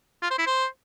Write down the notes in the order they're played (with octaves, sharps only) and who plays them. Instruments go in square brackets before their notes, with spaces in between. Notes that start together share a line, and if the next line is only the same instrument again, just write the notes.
[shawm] F4
C5
E4
C5